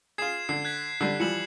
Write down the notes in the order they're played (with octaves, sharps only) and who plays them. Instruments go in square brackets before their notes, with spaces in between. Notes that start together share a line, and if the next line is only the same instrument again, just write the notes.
[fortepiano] F4 G#4 [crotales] G#6 C7 E7
[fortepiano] D3 [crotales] C7
[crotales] F#6 G#6 B6
[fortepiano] D3 G3 [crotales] C7
[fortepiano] E3 F3 G3 [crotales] C#7 E7 F#7